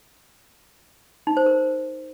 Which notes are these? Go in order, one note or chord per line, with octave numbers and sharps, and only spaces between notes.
D#4
C5
A#4